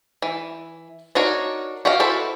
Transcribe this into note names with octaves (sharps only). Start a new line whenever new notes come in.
E3
D4 D#4 F#4 A#4 C#5
F#4 G4 D#5 F5
E4 F#4 A4 B4 C5